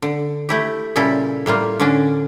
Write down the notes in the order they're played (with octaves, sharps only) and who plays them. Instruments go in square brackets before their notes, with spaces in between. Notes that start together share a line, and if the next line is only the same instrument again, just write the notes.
[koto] D3
A3 E4 G4
A#2 C#3 G3 E4 A4
A2 G3 A#3 F4
D3 C#4 D4